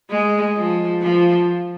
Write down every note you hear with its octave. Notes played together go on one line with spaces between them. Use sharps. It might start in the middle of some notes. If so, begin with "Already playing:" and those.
G#3
F3
F3